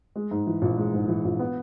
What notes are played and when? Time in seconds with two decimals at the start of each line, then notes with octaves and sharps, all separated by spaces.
0.16 G#3
0.31 G#2
0.47 E3
0.62 A#1
0.77 G#3
0.94 G#2
1.08 E3
1.25 A#1
1.39 B3